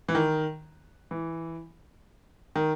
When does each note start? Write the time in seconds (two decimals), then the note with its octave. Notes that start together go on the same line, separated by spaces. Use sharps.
0.09 E3
0.15 D#3
1.11 E3
2.56 D#3